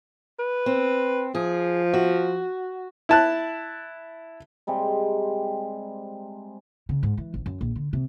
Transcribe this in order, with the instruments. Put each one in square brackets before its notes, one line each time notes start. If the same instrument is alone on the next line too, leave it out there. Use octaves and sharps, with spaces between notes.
[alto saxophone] B4
[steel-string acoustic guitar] C4
[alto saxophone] F3 [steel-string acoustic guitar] G#4
[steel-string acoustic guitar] F#4
[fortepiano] E4 A5 F#6
[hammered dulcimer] C3 G3 G#3
[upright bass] C#3
G#2
E3
A1
F#2
A#1
D3
C3